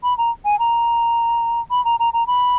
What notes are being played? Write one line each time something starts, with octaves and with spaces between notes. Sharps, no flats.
B5
A#5
G#5
A#5
B5
A#5
A#5
A#5
B5